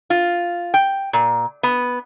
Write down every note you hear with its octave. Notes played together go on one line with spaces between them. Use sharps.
F4
G5
A#2
B3